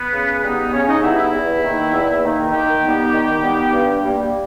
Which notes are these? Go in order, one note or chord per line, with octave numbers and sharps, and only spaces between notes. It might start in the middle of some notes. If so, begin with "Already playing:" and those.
Already playing: B3 B4
C#3
G3 B3 D#4
C#3 C#4 C#5
D#4 D#5
G3 B3 D#4 E4 E5
E4 E5
E2
D#3 A#3 D#4
E2
D#3 A#3 D#4
D#3 G4 G5
G3 B3 D#4
D#3
G3 B3 D#4
G2
G3 A#3